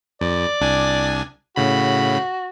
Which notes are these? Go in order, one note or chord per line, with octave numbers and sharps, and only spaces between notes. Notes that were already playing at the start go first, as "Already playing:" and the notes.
F2 D5
C2 D4 G#5
A2 C#3 F#4 B5